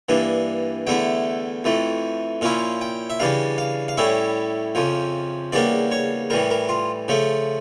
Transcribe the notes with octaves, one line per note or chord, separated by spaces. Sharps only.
G2 E3 A#3 D4
E2 D3 A3 E4 G5
F2 E3 A3
A#2 F3 C#4 E4 F5
G5
E5
C#3 E3 G3 D4 F5
F5
F5
A2 G3 C#4 E4 E5
F2 C#3 F3
E2 C#3 G3 A#3 D4 D5
C#5
A2 E3 G3 A#4
A#4
F4
C#3 F3 A3